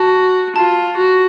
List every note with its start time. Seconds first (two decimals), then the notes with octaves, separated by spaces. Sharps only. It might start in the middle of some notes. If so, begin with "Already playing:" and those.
Already playing: F#4 A5
0.56 F4 A5
0.97 F#4